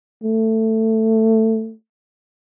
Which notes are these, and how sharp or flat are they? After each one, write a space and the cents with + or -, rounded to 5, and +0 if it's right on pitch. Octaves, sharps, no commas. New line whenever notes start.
A3 +15